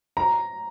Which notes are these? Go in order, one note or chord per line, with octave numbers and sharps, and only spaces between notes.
A#5